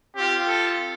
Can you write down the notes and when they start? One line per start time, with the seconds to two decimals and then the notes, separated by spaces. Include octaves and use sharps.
0.14 C4 F4 G4
0.45 A4